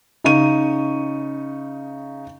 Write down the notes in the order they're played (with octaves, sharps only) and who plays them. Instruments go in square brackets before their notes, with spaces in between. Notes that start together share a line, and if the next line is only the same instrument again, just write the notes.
[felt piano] C#3 D#4 C#6 D#7